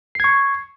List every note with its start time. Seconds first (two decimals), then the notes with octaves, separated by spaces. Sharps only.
0.15 C7
0.20 G#6
0.24 C#6